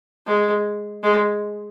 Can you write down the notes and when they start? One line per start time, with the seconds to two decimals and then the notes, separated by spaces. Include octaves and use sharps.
0.27 G#3
1.03 G#3